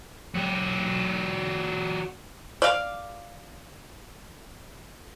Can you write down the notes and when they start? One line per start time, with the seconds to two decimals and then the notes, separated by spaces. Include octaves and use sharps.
0.34 F#3 G4
2.62 D5 F5